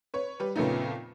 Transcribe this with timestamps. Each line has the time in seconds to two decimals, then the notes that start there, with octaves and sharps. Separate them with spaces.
0.14 B4 C#5
0.40 G3 B4
0.56 F2 A#2 C#3 A3 B3 D#4